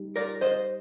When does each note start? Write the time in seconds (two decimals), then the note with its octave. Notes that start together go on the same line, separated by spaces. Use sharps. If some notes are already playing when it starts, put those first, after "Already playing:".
Already playing: G3 D#4
0.16 A#4 D5
0.41 C5 D#5